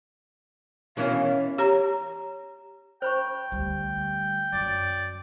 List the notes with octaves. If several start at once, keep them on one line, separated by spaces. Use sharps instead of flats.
B2 D#3 E3 C#4 E4 F5
G4 C#5 A#5
C5 G5 B5 C#6
D2 G3
F#2 D5